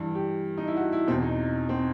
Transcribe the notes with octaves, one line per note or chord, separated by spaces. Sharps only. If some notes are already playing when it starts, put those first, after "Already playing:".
Already playing: G2 E3
G4
D#4
E4
F#4
E4
E2 B2 C4
D#4
C4